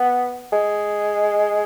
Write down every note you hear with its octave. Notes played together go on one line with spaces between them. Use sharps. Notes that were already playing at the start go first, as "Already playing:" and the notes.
Already playing: B3
G#3